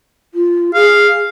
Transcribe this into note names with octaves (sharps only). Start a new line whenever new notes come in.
F4
G#4 F5